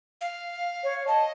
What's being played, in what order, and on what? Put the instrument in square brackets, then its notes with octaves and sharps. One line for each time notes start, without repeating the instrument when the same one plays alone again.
[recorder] F5
[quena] C#5
[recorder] D#5 [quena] A5